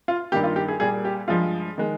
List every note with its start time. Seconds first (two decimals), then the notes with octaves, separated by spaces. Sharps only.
0.08 F4
0.32 G2 D#3 A#3 G4
0.43 F4
0.56 G4
0.68 G#4
0.80 A#2 G3 A#3 G#4
1.05 G4
1.28 G2 F3 G#3 F4
1.78 D#3 G#3